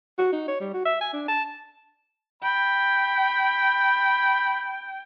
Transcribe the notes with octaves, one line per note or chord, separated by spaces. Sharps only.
F#4
D#4
C#5
G3
F#4
E5
G#5
D4
A5
G5 B5